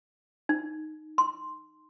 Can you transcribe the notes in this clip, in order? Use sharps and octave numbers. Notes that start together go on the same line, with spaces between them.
D#4
C6